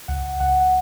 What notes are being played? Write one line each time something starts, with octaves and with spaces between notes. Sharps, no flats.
C#2 F#5
C#2 F#5